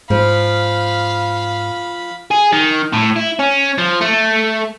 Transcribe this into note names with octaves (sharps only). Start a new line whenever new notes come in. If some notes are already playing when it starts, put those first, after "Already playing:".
G#2 F3 F5 B5
G#4
D#3
A2
E4
C#4
F3
A3